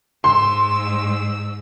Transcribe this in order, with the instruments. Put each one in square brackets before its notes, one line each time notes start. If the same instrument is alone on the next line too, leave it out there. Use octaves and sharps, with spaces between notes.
[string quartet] G#2 E6 [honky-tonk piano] C6